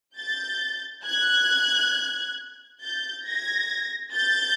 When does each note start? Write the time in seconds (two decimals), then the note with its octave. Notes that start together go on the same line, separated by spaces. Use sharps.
0.17 G6 A6
1.05 F#6 G#6
2.81 G6 A6
3.26 G#6 A#6
4.13 G6 A6